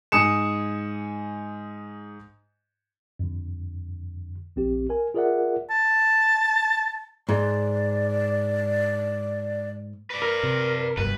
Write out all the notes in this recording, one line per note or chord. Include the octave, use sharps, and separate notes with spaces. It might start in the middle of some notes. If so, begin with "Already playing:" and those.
G#2 G#5 D#6 C#7 E7
F2 D3
A#1 C4 G4
A#4 G#5
F4 G#4 A#4 D5 E5 F#5
A5
G#2 D5
B4 D5
A#4
C3
F1 G2 B2 B4